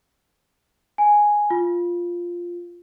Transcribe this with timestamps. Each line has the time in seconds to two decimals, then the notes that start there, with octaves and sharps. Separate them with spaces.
0.98 G#5
1.50 F4